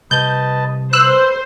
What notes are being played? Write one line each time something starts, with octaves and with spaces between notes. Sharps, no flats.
C2 B4 D#5 A5 G6
B4 C5 E6 F#6